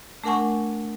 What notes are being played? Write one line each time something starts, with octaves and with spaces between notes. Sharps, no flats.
A3 D4 A#4 F#5 G#5 C#6